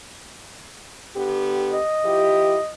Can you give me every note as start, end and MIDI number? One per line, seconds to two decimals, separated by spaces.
1.16 1.79 50
1.16 1.79 59
1.16 1.79 67
1.73 2.74 75
2.04 2.58 53
2.04 2.58 64
2.04 2.58 67